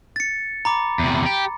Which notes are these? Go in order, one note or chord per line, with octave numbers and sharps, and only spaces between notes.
A6 C#7
A#5 B5 D6
E2 C3
G4